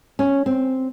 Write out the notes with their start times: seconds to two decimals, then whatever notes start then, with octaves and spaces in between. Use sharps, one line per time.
0.19 C#4
0.46 C4